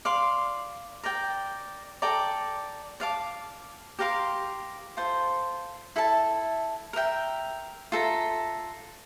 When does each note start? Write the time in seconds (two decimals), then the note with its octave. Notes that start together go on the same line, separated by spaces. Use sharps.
0.05 D5 F5 C6
1.04 A#4 D5 G5
2.02 A4 D5 G5 A#5
3.00 D5 F5 A5 D6
3.99 G4 A#4 F5 C6
4.97 F4 A4 C5
5.96 E4 A4 E5 A5
6.93 A#4 E5 G5
7.92 F4 A4 E5 A#5